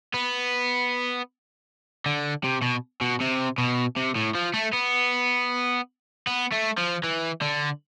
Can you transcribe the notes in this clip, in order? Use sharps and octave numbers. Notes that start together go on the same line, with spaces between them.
B3
D3
C3
B2
B2
C3
B2
C3
A2
F3
A3
B3
B3
A3
F3
E3
D3